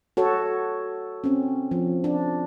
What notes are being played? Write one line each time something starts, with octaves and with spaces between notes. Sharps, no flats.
F#4 A4 C#5
C4 C#4
F3
D4